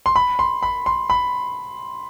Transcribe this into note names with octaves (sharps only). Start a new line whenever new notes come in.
C6
B5
C6
B5
C6
B5